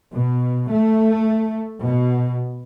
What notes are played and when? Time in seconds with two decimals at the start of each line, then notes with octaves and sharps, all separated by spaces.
0.13 B2
0.71 A3
1.83 B2